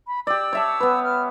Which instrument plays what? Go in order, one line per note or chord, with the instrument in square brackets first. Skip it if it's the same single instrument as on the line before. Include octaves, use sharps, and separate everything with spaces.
[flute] B5
[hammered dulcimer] G4 D5 [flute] E6
[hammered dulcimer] C#5 E5 A5
B3 B4
[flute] F6